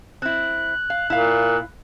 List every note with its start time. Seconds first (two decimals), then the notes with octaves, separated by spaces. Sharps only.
0.22 C4 E4 F#6
0.90 F5
1.10 A#2 E4 F5